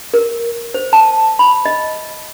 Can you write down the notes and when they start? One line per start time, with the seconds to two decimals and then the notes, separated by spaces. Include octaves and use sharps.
0.14 A#4
0.74 C5
0.93 A5
1.39 B5
1.65 D#5